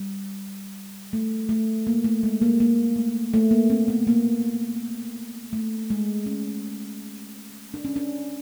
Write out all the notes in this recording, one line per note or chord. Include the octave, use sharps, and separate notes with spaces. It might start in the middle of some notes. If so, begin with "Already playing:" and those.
Already playing: G3
A3
A3
A#3
A3
G#3
A#3
A#3
A3
A3
A#3
C4
B3
A#3
A3
G#3
C#4
D4
C#4
D4